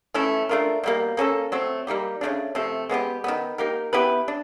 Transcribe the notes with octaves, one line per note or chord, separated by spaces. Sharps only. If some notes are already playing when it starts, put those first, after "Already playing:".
E3 A3 C#4 E4
A3 D4 F4 A#4
B2 G3 A#3
A#3 C#4 F#4 A4
F#3 A3 C4
G3 A#3 D#4 G4
C#3 F3 A3 D4
C3 F3 A3 C4
G#3 B3 D4 G4
D#3 F#3 B3
A#3 D#4 G4 A#4
B3 E4 G4 B4
D4